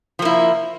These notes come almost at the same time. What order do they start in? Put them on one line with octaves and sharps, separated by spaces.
F3 A#3 E4